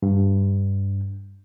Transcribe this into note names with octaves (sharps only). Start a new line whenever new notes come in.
G2